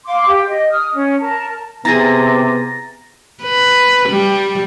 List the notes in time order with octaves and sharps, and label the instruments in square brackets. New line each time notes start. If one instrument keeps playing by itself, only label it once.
[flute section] F5 C6 D6
G4
D#5
D#6 F6
C#4
A#4 A5
[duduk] C3 [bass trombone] B3 [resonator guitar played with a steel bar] E4 G#4 [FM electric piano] A#5 A6 A#6
[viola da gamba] B4
G3